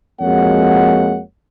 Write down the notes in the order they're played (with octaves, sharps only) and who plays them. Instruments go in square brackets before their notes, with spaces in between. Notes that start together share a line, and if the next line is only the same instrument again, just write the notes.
[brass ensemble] F2 G#3 A#3 F#4 C#5 F#5